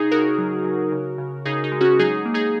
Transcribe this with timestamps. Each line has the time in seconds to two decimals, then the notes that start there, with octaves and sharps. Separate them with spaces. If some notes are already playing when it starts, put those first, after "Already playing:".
Already playing: C#3 D#4 G#4
0.12 C#3 F#4 A#4
0.38 F#3
0.65 F#3
0.92 C#3
1.18 C#3
1.45 C#3 D#4 G#4
1.64 D#4
1.72 G#3
1.81 C#4 F#4
1.99 F#3 D#4 G#4
2.25 A#3
2.34 D#4 G#4